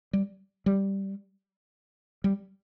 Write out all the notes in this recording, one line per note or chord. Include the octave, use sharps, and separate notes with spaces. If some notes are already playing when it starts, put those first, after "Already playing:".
G3
G3
G3